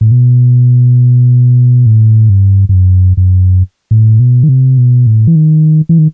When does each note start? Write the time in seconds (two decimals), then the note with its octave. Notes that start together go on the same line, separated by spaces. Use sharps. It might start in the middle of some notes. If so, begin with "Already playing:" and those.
0.01 A2
0.11 B2
1.86 A2
2.29 G2
2.69 G2
2.73 F#2
3.17 F#2
3.91 A2
4.20 B2
4.43 D#3
4.49 C3
4.78 B2
5.07 A2
5.27 E3
5.36 D#3
5.89 E3
5.99 D#3